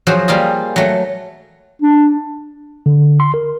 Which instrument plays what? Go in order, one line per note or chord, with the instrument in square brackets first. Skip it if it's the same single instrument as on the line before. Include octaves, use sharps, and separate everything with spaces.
[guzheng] F3 F#3 F#4 G#4 C5
G3 A#3 F4 G#4
F#3 A3
[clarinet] D4
[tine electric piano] D3
C6
A#4